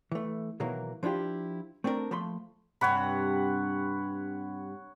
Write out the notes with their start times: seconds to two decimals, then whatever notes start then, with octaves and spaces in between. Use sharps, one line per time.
0.11 E3 A3
0.60 B2 D#3 E3 F#3 A#3
1.03 F3 D4 E4 F4 G4
1.84 A3 C4 D4 G4 A#4
2.11 F3 A3 A#3 B5 C6
2.81 G2 C3 C#5 F#5 B5